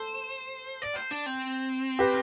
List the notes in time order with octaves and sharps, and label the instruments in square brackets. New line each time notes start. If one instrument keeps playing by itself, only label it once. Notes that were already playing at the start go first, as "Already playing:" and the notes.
Already playing: [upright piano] A4 [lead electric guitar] C5
[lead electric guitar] D5
C5
D4
C4
[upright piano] G4 B4